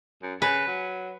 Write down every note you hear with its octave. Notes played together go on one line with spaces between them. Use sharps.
F#2
C#3 B4
F#3